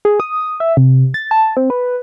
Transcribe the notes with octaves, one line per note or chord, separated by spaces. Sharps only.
G#4
D#6
E5
C3
A6
A5
C4
B4